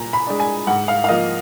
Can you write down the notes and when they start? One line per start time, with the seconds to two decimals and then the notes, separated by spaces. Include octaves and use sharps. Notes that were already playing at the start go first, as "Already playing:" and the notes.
Already playing: A#2 A#5
0.13 B5
0.27 G#3 D4
0.40 G#5
0.67 G#2 F#5
0.88 F5
1.04 F5
1.09 F3 A#3 D#5